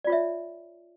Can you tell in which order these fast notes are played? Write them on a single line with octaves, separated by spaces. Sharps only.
D5 F4 C#5 E5